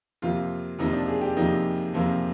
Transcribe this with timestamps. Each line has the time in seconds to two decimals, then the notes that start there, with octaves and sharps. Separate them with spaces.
0.22 F2 C3 F3 A#3 F4
0.79 F2 C3 F3 A#3 D#4
0.93 D4
1.08 G#4
1.21 G4
1.36 F2 C3 F3 A#3 D#4
1.94 F2 C3 F3 A#3